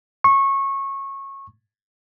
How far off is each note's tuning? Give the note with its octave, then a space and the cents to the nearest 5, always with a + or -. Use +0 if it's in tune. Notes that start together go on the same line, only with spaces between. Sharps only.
C#6 -20